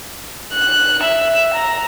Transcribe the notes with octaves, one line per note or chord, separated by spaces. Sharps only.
F#6
E5
A#5